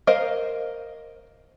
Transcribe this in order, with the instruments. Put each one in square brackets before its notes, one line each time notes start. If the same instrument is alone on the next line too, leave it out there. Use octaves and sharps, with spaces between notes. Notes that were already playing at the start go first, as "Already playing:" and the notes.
[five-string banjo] A#4 C5 D#5 F5